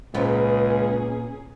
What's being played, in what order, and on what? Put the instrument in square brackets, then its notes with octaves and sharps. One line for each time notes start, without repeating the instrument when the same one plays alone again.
[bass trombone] C#2 [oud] A#2 B3 [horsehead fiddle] C#4 G#4